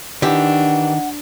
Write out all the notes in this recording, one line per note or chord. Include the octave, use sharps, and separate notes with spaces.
D#3 E3 D4 G4 F#5